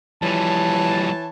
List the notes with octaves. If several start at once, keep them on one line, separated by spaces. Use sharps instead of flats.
E3 F3 G3 C#5 A5